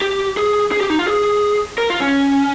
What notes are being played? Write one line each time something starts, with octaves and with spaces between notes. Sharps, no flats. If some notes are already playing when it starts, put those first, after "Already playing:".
G4
G#4
G#4
G4
D#4
F4
G#4
A#4
F4
C#4